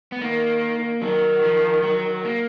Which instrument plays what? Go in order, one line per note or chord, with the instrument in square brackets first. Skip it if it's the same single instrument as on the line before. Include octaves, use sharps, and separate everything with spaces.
[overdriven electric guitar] B3
[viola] D#3 [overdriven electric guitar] A#3
[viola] D#3 [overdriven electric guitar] F#3
[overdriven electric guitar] F3
F#3
A#3